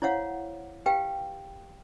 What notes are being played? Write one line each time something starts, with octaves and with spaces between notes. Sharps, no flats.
E4 C5 C#5 F5 F#5
G4 B4 F5 G5